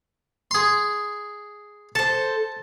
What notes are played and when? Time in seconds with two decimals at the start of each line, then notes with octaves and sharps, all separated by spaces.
0.51 G#4 C6
1.95 A4 C5 A5